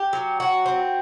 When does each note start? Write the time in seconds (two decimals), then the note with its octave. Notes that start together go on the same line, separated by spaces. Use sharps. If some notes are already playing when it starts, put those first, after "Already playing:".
Already playing: G4
0.13 F#3
0.40 F#4
0.66 C4